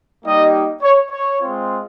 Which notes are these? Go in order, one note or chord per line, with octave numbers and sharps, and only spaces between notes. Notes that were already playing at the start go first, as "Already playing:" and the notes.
G3 A#3 D#4 G4 D#5
C#5
C#5
G#3 C4 F4